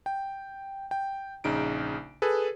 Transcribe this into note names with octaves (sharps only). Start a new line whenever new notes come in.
G5
G5
A#1 C#3 D#4 D7
G#4 A4 B4